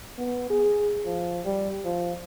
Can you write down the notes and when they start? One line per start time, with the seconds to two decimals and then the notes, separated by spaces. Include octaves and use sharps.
0.18 B3
0.50 G#4
1.05 F3
1.45 G3
1.85 F3